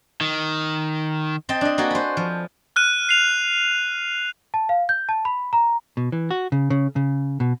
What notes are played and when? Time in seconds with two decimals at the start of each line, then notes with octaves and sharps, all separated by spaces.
0.21 D#3
1.49 C4 D#5 G5 A5
1.61 D4 D#5
1.78 A#3 F#4 A4 G#5
1.91 B4 C5
2.17 F3
2.76 F6 F#6 D#7
3.09 C7 F7
4.54 A5
4.69 F5
4.89 G6
5.09 A5
5.25 B5
5.53 A#5
5.97 B2
6.12 E3
6.31 F#4
6.52 C#3
6.70 C#3
6.96 C#3
7.40 B2